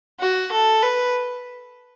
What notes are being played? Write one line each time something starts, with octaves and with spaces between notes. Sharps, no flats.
F#4
A4
B4